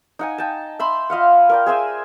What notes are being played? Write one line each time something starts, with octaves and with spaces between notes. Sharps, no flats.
D#4 F#5 G#5
G5 A5
E5 B5 C6
F4 D#5 F5 F#5
A#4 D5 G5
G#4 C5 E5 G#5